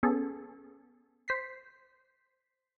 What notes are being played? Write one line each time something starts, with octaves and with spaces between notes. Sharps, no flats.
B3 C#4 G#4 A4
C5 B6 C7